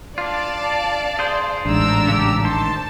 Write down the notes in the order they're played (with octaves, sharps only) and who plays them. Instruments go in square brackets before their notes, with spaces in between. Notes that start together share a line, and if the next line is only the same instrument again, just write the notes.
[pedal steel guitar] D4 F4 [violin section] D5 F5 A5
[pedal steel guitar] G#4 C5
[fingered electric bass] A1 G#2 [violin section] D4 A#5 E6
[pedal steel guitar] C#3 G4
[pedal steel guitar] D#3 C5 [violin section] A5